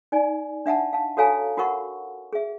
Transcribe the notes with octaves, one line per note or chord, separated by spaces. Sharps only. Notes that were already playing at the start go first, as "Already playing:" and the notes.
D#4 D5 G#5
D4 E5 F#5 A5
F5 A5
F#4 A4 C#5 F5 G#5 A#5
F4 F#4 A#4 F#5 C#6
G#4 E5